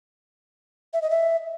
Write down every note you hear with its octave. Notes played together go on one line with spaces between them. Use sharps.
E5
D#5
E5